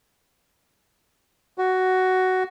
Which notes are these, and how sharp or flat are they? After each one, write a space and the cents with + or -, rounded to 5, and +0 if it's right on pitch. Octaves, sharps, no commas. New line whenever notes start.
F#4 +10